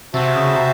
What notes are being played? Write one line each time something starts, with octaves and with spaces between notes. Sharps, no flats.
C3 F#4 C5 E5 A5
C#3
C3